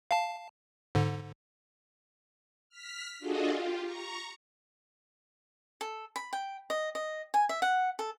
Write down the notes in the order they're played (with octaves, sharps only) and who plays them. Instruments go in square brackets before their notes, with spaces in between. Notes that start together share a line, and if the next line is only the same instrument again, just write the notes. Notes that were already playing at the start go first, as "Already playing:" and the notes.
[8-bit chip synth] F5 A5
G#2 D3
[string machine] F6 B6
D4 F4 F#4 G#4 A4 D#5
F4 G4
A#5 C#6
[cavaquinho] A4
B5
G5
D#5
D#5
G#5
E5
F#5
A4